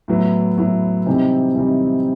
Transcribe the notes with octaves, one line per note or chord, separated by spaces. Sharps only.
A2 F#3 B3 E4
A2 F#3 B3 E4
C3 E3 G3 C4 D#4
C3 E3 G3 C4 D#4